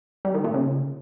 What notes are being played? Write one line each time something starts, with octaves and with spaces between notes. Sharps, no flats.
G3
D#3
A#2
C#3